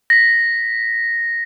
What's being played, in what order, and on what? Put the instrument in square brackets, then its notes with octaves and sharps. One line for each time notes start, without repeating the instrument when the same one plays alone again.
[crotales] A#6 B6